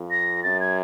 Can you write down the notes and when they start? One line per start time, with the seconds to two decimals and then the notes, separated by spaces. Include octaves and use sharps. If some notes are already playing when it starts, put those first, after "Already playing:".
Already playing: F2
0.11 A#6
0.43 F#2 A6
0.60 G#6